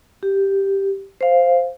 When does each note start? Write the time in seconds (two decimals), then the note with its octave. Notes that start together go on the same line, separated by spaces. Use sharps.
0.23 G4
1.21 C5 F5